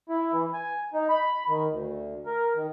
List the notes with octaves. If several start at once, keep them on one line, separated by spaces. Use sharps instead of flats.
E4
E3
G#5
D#4
B5
D#3
D2
A#4
D#3